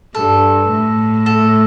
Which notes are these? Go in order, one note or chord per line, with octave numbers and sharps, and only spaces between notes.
G2 A4
A2
A4